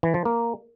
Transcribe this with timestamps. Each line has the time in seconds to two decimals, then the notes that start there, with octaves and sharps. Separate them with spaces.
0.03 E3
0.14 F3
0.25 A#3